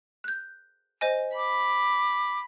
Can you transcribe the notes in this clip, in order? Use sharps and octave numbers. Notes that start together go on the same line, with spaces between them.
F#6 G6
C5 D#5 G#5
B5 D6